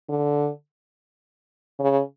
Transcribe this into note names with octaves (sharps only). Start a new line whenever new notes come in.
D3
C#3